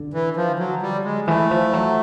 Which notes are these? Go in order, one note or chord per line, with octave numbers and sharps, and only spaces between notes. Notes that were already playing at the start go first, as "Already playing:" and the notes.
Already playing: D3
E3
F3
F#3
G3
G#3
E3 A3
F3
F#3